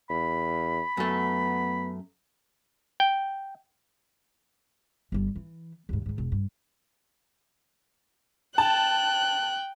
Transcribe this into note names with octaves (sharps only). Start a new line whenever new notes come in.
E2 B5
F#2 A3 B3
G5
G1 G3
E3
D#2 G#2
G#2 D#3
E1
G2
G5 A5 F#6